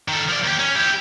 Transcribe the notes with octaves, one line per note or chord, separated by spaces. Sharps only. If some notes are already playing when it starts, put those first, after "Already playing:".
D#3 A4
F3 D5
D#2 G4
C#4
E4 G4